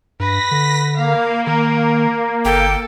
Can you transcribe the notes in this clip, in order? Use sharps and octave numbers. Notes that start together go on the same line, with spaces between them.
G2 B4 A#6 B6
D3
A#3 F5
D#3 A#4
G1 A4 G5